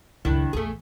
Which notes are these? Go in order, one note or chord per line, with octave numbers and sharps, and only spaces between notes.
C#2 F#2 D#3 D4 E4
A#1 E2 A3 G#4